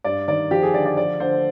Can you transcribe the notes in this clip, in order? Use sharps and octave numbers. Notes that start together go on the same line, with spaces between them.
G2 D5
D#3 D5
F3 G4
G#4
D3 D5
D5
F3 D5
D3 C5